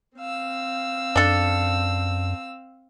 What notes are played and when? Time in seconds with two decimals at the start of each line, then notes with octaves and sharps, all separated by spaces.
0.17 C4 F5 E6
1.16 F#2 D4 A4